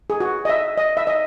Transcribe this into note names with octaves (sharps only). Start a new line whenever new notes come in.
G#4
F#4
D#5
E5
D#5
E5
D#5